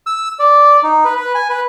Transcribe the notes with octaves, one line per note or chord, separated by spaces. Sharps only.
E6
D5
D#4
B4
B4
G#5
B4